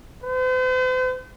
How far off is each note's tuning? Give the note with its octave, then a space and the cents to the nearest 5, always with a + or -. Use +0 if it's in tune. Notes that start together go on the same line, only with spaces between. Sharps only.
C5 -45